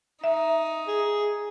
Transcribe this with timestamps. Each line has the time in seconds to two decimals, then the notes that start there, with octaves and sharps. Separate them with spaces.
0.24 D#4 E5
0.88 G#4